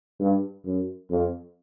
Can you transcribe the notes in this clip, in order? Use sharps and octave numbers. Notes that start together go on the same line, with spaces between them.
G2
F#2
F2